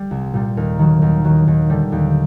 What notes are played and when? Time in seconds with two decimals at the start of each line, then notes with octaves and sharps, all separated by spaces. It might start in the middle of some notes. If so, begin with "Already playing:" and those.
Already playing: G3
0.11 C2
0.34 A#2 G3
0.57 D#2 A#4
0.79 D#3 F#3
1.02 D#2 A#4
1.25 D#3 F#3
1.48 D#2
1.70 D3 G3
1.92 D#2 G4